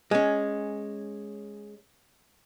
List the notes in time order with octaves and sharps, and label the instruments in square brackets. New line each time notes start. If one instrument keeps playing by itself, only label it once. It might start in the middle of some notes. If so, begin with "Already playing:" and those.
[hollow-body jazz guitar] G#3 C#4